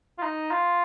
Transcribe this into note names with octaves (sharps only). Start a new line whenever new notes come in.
F4
D#4
F4